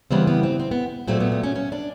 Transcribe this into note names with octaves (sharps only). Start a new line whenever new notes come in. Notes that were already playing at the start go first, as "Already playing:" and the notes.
C#3 E3 G3 B3 C4
B3
C4
C4
B3
A#2 F#3 A3 C4
B3
B3
C#4
C#4
D4